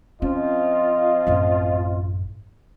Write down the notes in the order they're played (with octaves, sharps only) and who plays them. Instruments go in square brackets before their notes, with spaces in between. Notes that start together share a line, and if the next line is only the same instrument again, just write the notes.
[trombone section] F3 C4 F4 [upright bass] C#4 [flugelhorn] D#5
[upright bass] A1 F#2